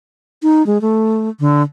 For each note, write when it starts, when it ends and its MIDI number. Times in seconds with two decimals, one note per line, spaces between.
0.43 0.65 63
0.67 0.81 56
0.81 1.29 57
1.40 1.62 50